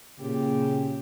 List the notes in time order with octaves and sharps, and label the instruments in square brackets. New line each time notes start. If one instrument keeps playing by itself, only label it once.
[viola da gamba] A#2 [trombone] C#3 [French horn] G4